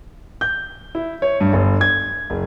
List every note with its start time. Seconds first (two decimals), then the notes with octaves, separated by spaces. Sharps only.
0.41 G6
0.95 E4
1.22 C#5
1.41 G2
1.53 G1
1.81 G#6
2.30 F#1